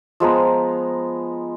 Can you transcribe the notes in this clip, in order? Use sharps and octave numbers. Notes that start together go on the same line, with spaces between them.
F3 G#3 B3 A#5